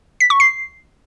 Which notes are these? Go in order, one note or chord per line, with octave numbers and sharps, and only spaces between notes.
B6
C#6
C7